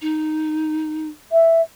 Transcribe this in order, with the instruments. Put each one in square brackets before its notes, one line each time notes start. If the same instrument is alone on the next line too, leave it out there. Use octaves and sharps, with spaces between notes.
[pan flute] D#4
[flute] E5